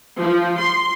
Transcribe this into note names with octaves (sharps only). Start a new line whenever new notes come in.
F3
C6